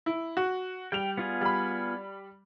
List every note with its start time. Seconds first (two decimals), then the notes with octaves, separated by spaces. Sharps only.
0.06 E4
0.37 F#4
0.92 G3 G5 F7
1.17 B3 F4 G#4
1.41 G3 B5